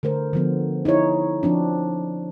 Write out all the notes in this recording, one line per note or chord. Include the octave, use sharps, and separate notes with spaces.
D3 A3 A#4 C5
D3 F3 B3
D#4 E4 G#4 C#5
F3 C4 D4